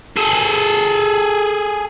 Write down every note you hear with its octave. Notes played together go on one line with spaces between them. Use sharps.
G#4 A4